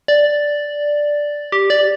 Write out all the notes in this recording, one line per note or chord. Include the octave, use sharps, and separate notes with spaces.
D5
G4
D5